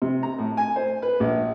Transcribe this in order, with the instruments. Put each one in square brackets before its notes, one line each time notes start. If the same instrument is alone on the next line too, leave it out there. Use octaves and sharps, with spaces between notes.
[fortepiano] C3
A#5
A2
G#5
C5
B4
A#1